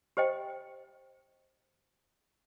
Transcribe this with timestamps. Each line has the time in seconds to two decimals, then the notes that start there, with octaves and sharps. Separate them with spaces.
0.17 G4 C5 D#5 G5